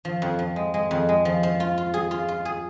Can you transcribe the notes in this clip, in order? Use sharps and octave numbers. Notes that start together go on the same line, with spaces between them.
F3
F2
F3
G#3
G#3
F2
G#3
F3
F3
F4
F4
G#4
F4
F4
G#4